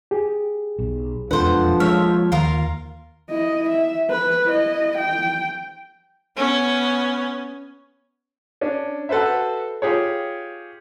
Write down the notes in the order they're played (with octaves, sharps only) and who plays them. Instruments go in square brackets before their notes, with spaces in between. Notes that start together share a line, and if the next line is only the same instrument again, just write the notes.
[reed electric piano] G4 G#4
[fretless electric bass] B1
[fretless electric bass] E1 F2 [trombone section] F3 [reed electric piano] D4 A4 B4 [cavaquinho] C5 F#5
[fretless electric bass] G#3 A#3 [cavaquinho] C#5 E5 [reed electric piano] F6
[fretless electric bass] D#2 [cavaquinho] F4 A#4 F5
[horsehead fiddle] E4 D#5
E5
B4
E4 D#5
G5
[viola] B3 C#4
[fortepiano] C#4 D4
F#4 A4 B4 C5 E5
F4 G4 G#4 C#5